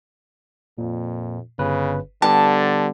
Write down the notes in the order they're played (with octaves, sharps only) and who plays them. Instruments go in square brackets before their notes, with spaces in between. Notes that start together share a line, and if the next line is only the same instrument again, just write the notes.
[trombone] F2 [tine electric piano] A#2
[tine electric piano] G1 B4 [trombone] C#3
[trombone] D3 [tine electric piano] G3 B3 G4 [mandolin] A5